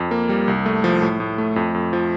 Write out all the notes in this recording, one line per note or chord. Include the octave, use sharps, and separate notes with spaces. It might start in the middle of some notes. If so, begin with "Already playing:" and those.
Already playing: F2
A#3
G3
C2
A3
F3
A2
A2
A3
F2
F2
F3